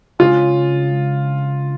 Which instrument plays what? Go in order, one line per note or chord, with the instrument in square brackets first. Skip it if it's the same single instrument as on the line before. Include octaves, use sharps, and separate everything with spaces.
[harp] C#3 G#3 C#4 [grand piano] F4